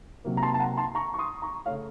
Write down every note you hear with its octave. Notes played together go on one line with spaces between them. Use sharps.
C3 F#3 A#3
A#5
A5 C6
A5
F#5 A#5
A5 C6
A#5 C#6
C#6
C6 D#6
A#5 C#6
C#3 A3 C#5 F5